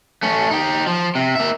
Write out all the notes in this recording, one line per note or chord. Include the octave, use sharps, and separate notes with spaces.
A3 C#4
D#4 G4
F3
C3
A#3 E5